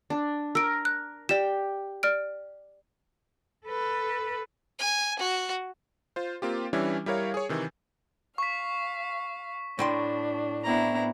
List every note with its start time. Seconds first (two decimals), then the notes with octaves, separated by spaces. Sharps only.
0.10 D4
0.55 A#4 E6 D7
0.85 F#6
1.29 G4 D5 E7
2.03 D5 F6 D7
3.67 A4 B4
4.79 G#5
5.19 F#4
6.16 F4 C5
6.42 A#3 C4 F4 G4
6.73 E3 G3 C#4 D4 E4
7.06 G3 E4 A#4 C#5 F5
7.34 G#4 C#5
7.49 C3 D#3 E3
8.38 F5 C#6 B6
9.79 A2 D4 G5 C6
10.64 B3 C4 D4 E4 A#5